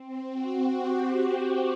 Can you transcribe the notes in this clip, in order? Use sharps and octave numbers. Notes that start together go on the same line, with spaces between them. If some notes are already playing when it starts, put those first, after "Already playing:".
Already playing: C4
F#4
G4
F#4